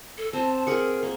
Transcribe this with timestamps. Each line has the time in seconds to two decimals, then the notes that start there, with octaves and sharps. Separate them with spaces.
0.18 A4
0.33 C4 A5
0.67 G#4 A#4 F#5
1.03 A#3